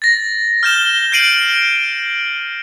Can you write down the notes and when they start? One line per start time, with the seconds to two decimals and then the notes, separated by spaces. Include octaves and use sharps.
0.02 A6 A#6
0.63 F6 G6 E7 G7
1.12 G6 C7 D7 D#7 F#7